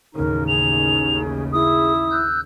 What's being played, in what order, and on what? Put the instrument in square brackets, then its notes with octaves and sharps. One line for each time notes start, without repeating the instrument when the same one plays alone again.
[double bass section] A1 D#2 C#3 [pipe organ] D#4 [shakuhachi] A#4
[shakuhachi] G#4 [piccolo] F7
[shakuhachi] E4 [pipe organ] G#4 [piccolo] D#6
[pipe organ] E6 F#6 G6